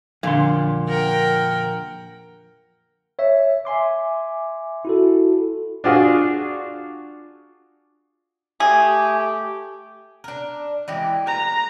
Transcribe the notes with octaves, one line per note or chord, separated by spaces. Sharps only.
F2 A#2 D3 C6
A#4 F#5 G5
C#5 E5
E5 G#5 C6 D6
E4 F#4 A4
D4 F4 F#4 G#4
A3 G4 G#4
D4 A#4
E3 G#3 G4
B4 A#5